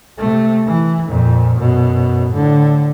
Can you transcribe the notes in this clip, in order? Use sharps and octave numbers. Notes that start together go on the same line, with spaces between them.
C3 A3
E3
F2 A#2
F#2 B2
A2 D3